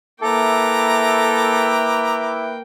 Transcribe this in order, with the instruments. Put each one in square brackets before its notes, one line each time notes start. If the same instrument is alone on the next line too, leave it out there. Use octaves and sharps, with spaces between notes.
[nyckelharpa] A#3 G5 [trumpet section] E4 B4 E5 [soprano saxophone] A4 [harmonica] A#5 D6